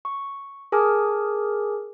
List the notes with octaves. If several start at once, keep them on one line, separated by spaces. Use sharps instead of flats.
C#6
G#4 A#4 G#5 A5 D6 F6